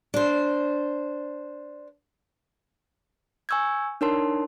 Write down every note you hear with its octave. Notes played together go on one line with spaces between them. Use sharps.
D4 C5
G#5 C#6 E6 G6 G#6
D4 D#4 A#4 C#5 A5 C6